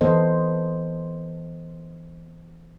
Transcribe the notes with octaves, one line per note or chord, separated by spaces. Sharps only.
E3 B3 A4 C5 D#5